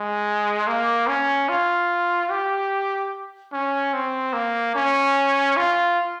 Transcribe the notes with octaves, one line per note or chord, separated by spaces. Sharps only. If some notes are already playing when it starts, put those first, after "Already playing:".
Already playing: G#3
A#3
C#4
F4
G4
C#4
C4
A#3
C#4
F4